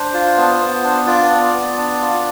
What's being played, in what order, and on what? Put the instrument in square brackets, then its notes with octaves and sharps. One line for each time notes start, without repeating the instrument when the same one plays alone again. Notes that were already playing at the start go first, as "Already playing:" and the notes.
Already playing: [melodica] D4 C5
F4
B3
B3
D4
F4 D5
B3
B3
D4
F4